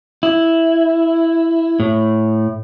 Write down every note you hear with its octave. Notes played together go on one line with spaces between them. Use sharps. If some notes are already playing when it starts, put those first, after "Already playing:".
E4
A2